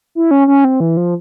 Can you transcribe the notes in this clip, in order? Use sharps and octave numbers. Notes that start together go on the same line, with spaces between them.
E4
C#4
C#4
C4
E3
F3